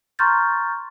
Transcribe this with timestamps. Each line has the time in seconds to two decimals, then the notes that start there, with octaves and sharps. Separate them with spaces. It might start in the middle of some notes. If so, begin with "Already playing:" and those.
0.19 A#5 C6 C#6 F6 G6 A6